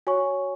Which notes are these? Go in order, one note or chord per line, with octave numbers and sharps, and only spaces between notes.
F#4 C#5 G#5 C#6